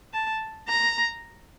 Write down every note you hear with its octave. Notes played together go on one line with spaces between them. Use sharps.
A5
A#5